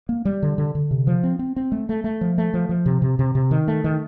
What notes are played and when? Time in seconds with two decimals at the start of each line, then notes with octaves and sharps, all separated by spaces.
0.09 A#3
0.25 G3
0.42 D3
0.58 D3
0.75 D3
0.91 C3
1.07 F3
1.24 C4
1.39 C4
1.56 C4
1.72 A3
1.89 A3
2.04 A3
2.21 F3
2.38 A3
2.54 F3
2.69 F3
2.86 C3
3.02 C3
3.19 C3
3.35 C3
3.51 D#3
3.68 A3
3.84 D#3